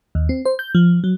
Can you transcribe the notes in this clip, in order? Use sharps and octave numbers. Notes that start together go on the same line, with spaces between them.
D#2
C4
C5
G6
F3
F#3